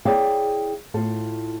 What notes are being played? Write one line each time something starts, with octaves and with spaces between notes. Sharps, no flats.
E4 G#4 C#5 D5 F5 G5
A2 F4 A4